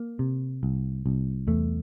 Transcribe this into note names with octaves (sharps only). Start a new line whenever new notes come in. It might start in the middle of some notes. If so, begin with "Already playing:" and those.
Already playing: A#3
C3
C2
C2
E2 A3